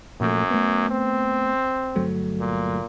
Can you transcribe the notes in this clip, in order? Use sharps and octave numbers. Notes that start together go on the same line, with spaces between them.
F#2 A#2 F3 A3
A3 B3
C4
G1 F#3 A3
A#2